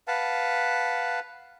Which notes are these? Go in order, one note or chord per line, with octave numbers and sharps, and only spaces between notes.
B4 F5 F#5 A5